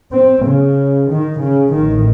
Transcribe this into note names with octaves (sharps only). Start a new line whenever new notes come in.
C4
C#3
D#3
C#3
A1 A2 D#3